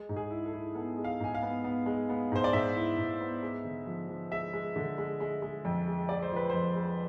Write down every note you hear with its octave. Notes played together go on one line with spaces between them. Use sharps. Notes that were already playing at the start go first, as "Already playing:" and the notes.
Already playing: G#3
G#2
G#4
E4
A4
E4
B3 A4
G#3
F5
G#2 G#5
F5
B3
B3
G#3
B3
G#2 C5
D5
G#2 E5
E4
G#2
B3
G#3
D3
F3
F3
G#3 E5
G#3
D3
G#3
G#3
G#3
F2
G#3
G#3 D5
C5
F3 B4
F2 C5
G#3